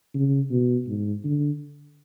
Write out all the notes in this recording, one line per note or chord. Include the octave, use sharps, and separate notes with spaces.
C#3
B2
G#2
D3